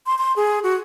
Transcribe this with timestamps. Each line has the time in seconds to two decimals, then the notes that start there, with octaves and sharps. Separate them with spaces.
0.06 C6
0.18 C6
0.36 G#4
0.63 F#4